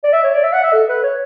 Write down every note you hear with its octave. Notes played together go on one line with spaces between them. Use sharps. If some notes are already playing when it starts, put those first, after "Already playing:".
D5
E5
C#5
D5
E5
F#5
E5
A4
B4
C#5